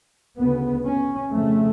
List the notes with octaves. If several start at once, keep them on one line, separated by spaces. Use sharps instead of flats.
D2 C#3 B3
C#4
F2 C#3 A3